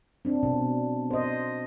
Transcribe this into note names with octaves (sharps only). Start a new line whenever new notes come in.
C4 D4
B2
C5 D#5